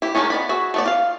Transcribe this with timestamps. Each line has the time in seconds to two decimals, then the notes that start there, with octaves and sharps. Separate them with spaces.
0.02 E4 G4
0.15 D#3 F#3 G#3 A3 C#4
0.30 B3 D5 B5
0.49 F#4 G#4 E5
0.74 A3 B3 D5
0.86 F4 F5